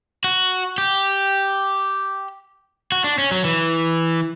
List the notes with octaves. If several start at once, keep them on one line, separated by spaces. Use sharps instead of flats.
F#4
G4
F#4
D4
C#4
F#3
E3